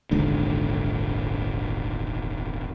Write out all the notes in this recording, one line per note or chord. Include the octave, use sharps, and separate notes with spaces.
D#1 G#1 G#2 D3